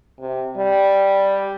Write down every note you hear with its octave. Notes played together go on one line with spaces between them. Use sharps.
C3
G3